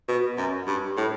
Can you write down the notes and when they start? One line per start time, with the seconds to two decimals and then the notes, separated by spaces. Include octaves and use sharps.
0.08 B2
0.38 F#2
0.67 G2
0.97 A2